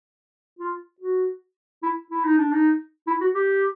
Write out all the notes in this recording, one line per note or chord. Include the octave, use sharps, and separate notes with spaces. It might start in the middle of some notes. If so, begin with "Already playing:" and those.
F4
F#4
E4
E4
D#4
D4
D#4
E4
F#4
G4